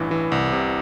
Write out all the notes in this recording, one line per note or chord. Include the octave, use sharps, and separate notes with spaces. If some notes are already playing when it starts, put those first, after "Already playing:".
Already playing: A1 G2 E3
E3
C2
C3